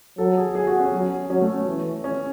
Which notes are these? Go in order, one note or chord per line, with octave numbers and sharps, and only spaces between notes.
F#3 A4
G#4
G#4
F#4
C#4
F#3
F#3 C#4
A3
E3
C#4